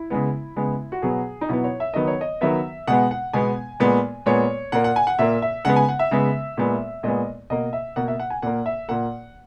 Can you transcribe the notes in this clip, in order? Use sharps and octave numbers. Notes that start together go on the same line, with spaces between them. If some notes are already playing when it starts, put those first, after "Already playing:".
Already playing: E4
C#3 G#3 B3
C#3 G#3 B3
F#4
B2 F#3 B3 G#4
D#4
B2 F#3 B3 E4
C#5
E5
D#3 F#3 B3 D#5
C#5
D#5
D#3 F#3 B3 E5
B2 G#3 B3 F#5
F#5
B2 G#3 B3 G#5
A#2 G#3 B3
A#2 G#3 B3 C#5
A#2 A#3 F#5
F#5
G#5
F#5
A#2 A#3 E5
E5
C#3 G#3 B3 F#5
G#5
F#5
E5
C#3 G#3 B3
A#2 G#3 B3
A#2 G#3 B3 D#5
B2 A#3 D#5
E5
B2 A#3 F#5
E5
F#5
G#5
A#2 A#3 F#5
E5
A#2 A#3 F#5